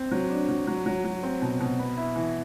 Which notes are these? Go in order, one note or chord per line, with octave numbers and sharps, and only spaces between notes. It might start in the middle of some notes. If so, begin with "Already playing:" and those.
Already playing: C4
F#3
D4
F#3
F#3
F#3
F#3
C4
B2
B2
B3
E4
E3